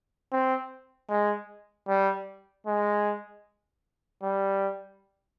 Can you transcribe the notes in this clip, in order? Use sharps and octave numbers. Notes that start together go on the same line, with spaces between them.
C4
G#3
G3
G#3
G3